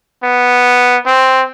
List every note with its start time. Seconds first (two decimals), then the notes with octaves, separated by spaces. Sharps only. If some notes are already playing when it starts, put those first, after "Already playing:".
0.24 B3
1.06 C4